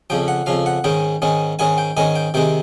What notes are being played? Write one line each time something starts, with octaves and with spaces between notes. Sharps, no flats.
F2 C#3 F3 G5
F#5
F2 C#3 F3 F5
F#5
G#2 D#3 G#3 C#4 G5
G#2 D#3 G#3 C#4
G#2 D#3 G#3 C#4 G#5
G5
G#2 D#3 G#3 C#4 G#5
G5
C3 D#3 G#3 G5